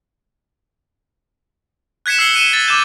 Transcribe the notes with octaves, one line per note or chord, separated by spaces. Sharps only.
F#6 G#6 B6 C#7 E7
E6 F#6 C7 C#7 G7
F#6 C#7 D#7 E7 G7
A6
D6 G6 E7